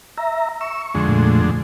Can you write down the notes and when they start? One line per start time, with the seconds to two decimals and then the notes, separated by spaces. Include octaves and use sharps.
0.18 E5 A#5
0.61 C#6 E6
0.95 F2 D3 G#3
1.08 A#2 A3